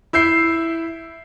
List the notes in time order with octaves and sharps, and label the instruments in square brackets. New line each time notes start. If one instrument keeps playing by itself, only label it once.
[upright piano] E4 E5 G6 C7